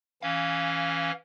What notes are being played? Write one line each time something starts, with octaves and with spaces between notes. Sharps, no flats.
E3 C#4 F5